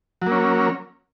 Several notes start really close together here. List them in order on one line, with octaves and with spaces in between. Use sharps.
F#3 A#3 C#4